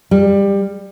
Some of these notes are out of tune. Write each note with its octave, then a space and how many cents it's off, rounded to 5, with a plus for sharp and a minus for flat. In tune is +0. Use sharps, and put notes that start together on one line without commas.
G3 +20